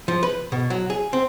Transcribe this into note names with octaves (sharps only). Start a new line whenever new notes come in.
F3
B4
B2
F#3
G#4
C4